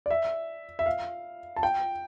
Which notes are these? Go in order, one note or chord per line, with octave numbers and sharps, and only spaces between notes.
D5
E5
E5
F5
A5
G5